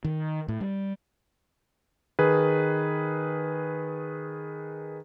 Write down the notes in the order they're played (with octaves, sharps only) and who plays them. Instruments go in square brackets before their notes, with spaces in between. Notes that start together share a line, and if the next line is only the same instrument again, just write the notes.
[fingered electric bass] D#3
A2
G3
[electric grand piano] D#3 G#4 B4